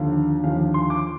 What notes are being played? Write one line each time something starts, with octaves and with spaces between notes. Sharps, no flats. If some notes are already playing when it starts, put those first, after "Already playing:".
Already playing: D#2 D3 F3 F5
D#2 D3 F3 F5
C6
D6